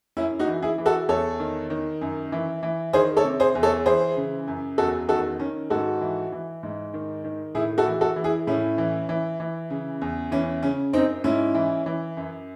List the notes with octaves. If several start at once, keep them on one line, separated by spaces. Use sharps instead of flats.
F#2 C#4 E4
D#4 F#4
E3
E4 G#4
E3
F#4 A4
E2 A4 C#5
D#3
D#3
F#2
E3
E3
D#3 G#4 C5
A4 C#5
C3
G#4 C5
E2
A4 C#5
E3 G#4 C5
C#3
F#2
E2 F#4 A4
D#3 F#4 A4
D#3 C#4
G#2 F#4 A4
E3
E3
G#2
D#3
D#3
A2 E4 G#4
F#4 A4
E3
F#4 A4
E3
E4 G#4
A2 C#4 E4
E3
E3
E3
C#3
E2
E3 C#4
C#3 C#4
F#2 C4 D#4
G#2 C#4 E4
E3
E3
F#2